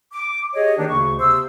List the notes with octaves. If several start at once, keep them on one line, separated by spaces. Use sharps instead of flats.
D6
G4 G#4 C#5 D#5
D#3 A#3 D4 D#4
D2 C#3 C#6
C3 B3 C5 E6